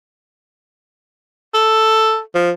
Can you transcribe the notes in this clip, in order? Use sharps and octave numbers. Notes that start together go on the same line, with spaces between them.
A4
F3